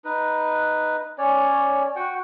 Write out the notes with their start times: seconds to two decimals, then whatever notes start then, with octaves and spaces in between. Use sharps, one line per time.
0.05 D#4 B4
1.18 C#4 C#5 D5
1.96 F#4 F#5 G5